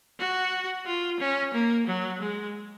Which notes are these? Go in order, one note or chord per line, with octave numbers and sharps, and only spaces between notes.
F#4
F4
C#4
A#3
F#3
G#3